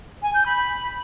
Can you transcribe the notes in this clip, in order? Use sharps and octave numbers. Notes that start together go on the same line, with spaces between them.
G#5
G6
B5